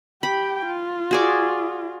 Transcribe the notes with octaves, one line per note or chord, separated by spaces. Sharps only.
G4 G5 B5
F4
F#4 G#4 D5